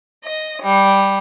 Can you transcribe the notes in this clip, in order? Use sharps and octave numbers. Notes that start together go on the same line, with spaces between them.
D#5
G3